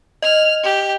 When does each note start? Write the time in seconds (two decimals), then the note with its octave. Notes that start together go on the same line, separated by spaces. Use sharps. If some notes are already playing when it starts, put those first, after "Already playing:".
0.22 D#5 F6
0.63 G4